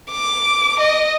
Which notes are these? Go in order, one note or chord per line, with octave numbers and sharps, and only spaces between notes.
D6
D#5